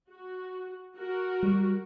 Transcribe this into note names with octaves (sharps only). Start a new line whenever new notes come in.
F#4
F#4 A#4
G3